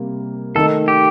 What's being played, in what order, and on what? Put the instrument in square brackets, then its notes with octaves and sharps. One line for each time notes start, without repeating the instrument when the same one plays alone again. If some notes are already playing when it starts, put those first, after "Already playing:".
Already playing: [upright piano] C3 G3 A#3
[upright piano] D#3 A3 D#4 [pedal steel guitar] A4
[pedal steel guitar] G4